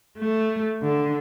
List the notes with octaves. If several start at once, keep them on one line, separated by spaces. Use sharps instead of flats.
A3
D3